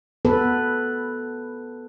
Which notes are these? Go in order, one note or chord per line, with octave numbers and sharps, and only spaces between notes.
B3 A4 B4